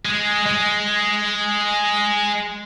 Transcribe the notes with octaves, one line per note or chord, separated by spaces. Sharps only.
G#3
G#3